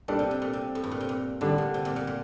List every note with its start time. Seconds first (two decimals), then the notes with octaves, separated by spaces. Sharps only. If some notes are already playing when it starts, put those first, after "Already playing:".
0.08 A#2 G3 D4 A4 D5
0.19 C3
0.31 C3
0.42 A#2
0.53 C3
0.75 A2
0.84 G2
0.91 A#2
1.00 C3
1.09 A#2
1.41 A2 D3 G3 D4
1.58 A#2
1.74 C3
1.85 A#2
1.96 A#2
2.07 A#2